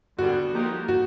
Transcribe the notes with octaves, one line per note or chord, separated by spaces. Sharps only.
D3 G3 B3 F#4
F3 A#3 D#4 G4 A#4
F#4